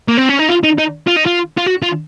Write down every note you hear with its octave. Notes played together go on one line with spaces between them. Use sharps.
A#3
C4
C#4
D#4
F4
D#4
D#4
F4
D#4
F4
F4
F#4
F4